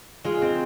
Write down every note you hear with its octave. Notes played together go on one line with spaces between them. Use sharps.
G#3 F4
C4